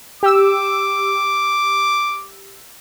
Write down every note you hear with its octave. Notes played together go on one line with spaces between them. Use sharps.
G4 D6 E6